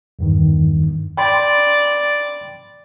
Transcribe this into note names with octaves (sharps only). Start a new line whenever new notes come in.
E2 G2 D#3
D5 G5 B5 C6